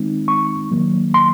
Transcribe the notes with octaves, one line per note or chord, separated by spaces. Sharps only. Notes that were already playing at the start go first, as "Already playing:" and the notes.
Already playing: D#3 G#3 C4 D#4
C#6
D#3 F#3 A#3
C6